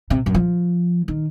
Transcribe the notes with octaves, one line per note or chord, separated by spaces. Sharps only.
C3
F#2
F3
D#3